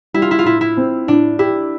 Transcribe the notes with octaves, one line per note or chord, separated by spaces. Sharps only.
G3 E4
F4
E4
F4
A2 E4
E4
C4
A2 D4
E4 G4